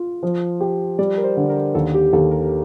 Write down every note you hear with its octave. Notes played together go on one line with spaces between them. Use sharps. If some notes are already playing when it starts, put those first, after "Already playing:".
Already playing: F4
F3
G4
G3 D5
A#4
C5
D3
A#4
D#2 A4
G4
D#2 A4
A#4